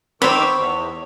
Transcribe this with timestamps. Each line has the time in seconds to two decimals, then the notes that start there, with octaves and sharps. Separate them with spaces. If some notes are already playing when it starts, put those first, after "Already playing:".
0.22 D#3 C5 C#5 B5 D6 E6
0.57 E2